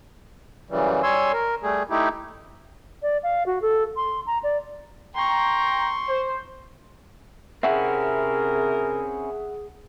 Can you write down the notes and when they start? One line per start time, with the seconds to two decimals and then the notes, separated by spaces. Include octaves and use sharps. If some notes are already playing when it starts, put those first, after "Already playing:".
0.70 F#2 C#3 E3 G3
1.03 G3 C#5 G#5 C6 E6
1.33 A#4
1.63 G3 A3 G#4
1.91 A3 D#4 E4 G4
3.02 D5
3.23 F5
3.46 F#4
3.62 A4
3.96 C6
4.26 A#5
4.43 D5
5.15 G5 A#5 C6 C#6
6.08 C5
7.63 C3 C4 C#4 E4 G#4 A#4 E5 F#5